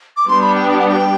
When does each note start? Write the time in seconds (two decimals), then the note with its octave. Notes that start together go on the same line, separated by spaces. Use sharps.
0.17 D6
0.27 G3 B3 D4 G4 C6
0.41 B5
0.55 G5
0.69 G5
0.79 F#5
0.89 G5